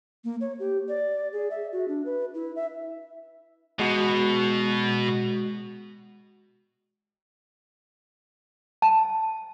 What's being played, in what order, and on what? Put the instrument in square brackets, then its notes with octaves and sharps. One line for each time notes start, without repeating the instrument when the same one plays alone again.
[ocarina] A#3
C#5
G4
D5
G#4
E5
F#4
D4
B4
E4
E5
[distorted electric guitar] B2 [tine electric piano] G#3 F#4
[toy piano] A5